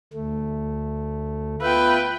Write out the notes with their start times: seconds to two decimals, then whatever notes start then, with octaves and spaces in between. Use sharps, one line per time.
0.13 D2 A3
1.62 B3 F4 B4 E5 G5